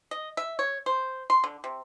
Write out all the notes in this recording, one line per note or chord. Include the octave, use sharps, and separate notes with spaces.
D#5
E5
C#5
C5
C6
D3
C3